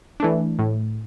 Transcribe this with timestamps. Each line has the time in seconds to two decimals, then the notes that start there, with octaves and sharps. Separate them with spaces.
0.20 E3 A3 D4
0.59 A2